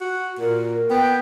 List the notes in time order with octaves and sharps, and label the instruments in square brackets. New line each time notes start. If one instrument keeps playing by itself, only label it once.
[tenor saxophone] F#4
[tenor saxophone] A#2 [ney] A#4
[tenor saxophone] B3 [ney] G5